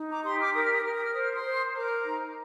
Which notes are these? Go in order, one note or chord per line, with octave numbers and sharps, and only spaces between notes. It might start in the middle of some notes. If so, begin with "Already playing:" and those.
Already playing: D#4
A#5 D6
G4 C6 D#6
D6 F6
A#4 D#6
F6
D#6
A#4 F6
D#6
F6
C5 D#6
F6
C6 D#6
C5
A#4 A#5 D6
D#4